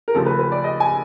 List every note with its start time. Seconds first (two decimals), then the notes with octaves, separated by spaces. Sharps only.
0.08 A#4
0.15 D#2 C#3 F3 A3 A4
0.26 B4
0.39 B4
0.52 D5
0.64 D#5
0.80 G#5